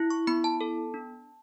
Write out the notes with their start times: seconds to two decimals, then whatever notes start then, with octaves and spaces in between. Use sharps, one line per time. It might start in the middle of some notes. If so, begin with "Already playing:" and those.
Already playing: E4
0.10 C#6
0.27 B3 B5
0.44 A5
0.61 A4
0.94 D4